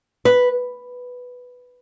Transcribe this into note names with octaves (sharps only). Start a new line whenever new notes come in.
B4